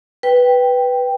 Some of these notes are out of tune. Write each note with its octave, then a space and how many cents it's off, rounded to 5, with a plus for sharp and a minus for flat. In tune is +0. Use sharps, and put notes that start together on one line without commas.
B4 +0 G5 +0